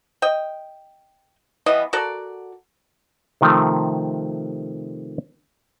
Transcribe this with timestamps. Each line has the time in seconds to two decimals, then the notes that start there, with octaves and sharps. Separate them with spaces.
0.22 D#5 G5
1.66 E3 G3 B3 D#5
1.93 F#4 A4 A#4 D5
3.41 C3 D#3 F3 A3 C4